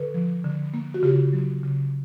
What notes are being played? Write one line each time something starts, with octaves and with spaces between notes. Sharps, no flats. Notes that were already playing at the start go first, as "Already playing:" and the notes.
Already playing: D3 A4 B4
F3
D3
A#3
F#4
C#3 F4 G4
F#3
C#3